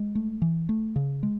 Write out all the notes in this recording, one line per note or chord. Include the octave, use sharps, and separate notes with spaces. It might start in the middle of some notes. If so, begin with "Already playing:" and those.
Already playing: G#3
A3
E3
A3
C#3
G#3